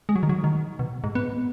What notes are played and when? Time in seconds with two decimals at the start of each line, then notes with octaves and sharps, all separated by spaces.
0.09 G#3
0.16 F#3
0.23 D#3
0.29 F#3
0.44 D#3
0.79 B2
1.04 G#2
1.15 B3